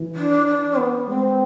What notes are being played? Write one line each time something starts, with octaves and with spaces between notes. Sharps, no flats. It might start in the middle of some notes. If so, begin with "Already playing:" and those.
Already playing: E3
D4
D4
B3
G#3 C4